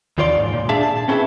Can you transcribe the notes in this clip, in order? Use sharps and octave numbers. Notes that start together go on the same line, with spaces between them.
D#2 D#3 F4 C#5 D5 C6
G#2
A#2
D4 G#4 E5 F5 A5
A5
C4 C#4 E4 G#4 B4 E5